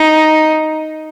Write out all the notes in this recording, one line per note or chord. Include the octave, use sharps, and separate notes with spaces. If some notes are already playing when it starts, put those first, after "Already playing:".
Already playing: D#4